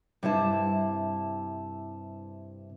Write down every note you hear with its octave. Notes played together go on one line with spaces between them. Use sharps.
G2 C3 E4 A5